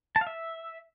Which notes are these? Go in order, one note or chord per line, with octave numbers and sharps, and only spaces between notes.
A5
F5
E5